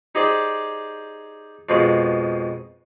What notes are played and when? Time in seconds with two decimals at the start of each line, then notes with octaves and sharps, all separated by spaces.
0.15 D#4 G4 G#4 C5 D5
1.69 F2 B2 F3 G#3 C6